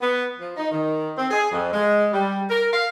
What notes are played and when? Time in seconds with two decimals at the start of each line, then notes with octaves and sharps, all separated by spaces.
0.01 B3
0.39 F3
0.57 D#4
0.72 D#3
1.17 C4
1.31 G#4
1.52 F2
1.73 G#3
2.12 G3
2.50 A#4
2.73 F5